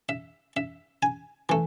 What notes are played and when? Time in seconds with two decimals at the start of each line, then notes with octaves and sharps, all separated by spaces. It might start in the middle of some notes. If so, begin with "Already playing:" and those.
0.09 E5
0.57 E5
1.03 G#5
1.49 E3 A3